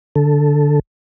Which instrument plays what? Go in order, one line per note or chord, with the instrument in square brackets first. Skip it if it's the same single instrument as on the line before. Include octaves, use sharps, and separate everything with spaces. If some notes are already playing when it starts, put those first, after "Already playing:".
[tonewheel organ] D3 A4